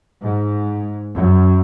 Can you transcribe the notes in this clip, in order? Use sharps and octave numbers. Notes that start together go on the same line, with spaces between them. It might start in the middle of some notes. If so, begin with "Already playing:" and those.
G#2
F#2